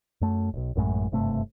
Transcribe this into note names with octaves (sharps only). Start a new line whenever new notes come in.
F#2 A3
E1 B1
A1 F#2 A2 G#3
F#1 G2 C3 A3